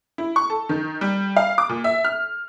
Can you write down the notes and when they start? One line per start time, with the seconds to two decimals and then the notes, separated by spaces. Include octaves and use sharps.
0.18 E4
0.36 C#6
0.50 A4
0.69 D#3
1.01 G3
1.36 F5
1.58 D6
1.69 A#2
1.84 E5
2.05 F6